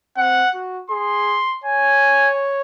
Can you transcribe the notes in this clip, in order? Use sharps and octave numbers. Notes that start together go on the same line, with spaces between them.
C4 F#5
F#4
G#4 C6
C#5 G#5